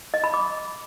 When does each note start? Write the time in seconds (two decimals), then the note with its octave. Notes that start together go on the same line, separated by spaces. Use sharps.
0.14 D#5
0.24 B5
0.34 D6